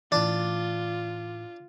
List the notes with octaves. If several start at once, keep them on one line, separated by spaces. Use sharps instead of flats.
A2 E3 D4 F4